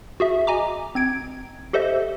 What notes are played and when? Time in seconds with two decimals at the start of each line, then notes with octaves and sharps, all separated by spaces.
0.20 F#4 G#4 E5
0.47 D#5 G#5 A#5 D6
0.95 C4 G#6 D7
1.73 G4 A4 C5 D#5 E5